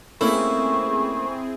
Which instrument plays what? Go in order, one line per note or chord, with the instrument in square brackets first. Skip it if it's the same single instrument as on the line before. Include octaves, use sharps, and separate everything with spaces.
[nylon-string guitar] A3 A#3 C#4 [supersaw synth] C4 G#4 [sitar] E4 [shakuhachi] C#6